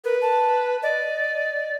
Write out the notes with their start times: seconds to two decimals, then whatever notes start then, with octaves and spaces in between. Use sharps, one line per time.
0.04 A#4 B4
0.22 A5
0.83 D5 D#5